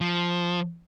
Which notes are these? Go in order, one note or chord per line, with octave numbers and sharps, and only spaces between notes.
F3